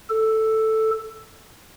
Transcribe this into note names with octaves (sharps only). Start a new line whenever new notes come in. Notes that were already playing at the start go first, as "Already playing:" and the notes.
A4